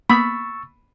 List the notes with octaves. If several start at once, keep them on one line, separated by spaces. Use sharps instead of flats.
A#3 B3 B5 C#6 D#6 E6 A6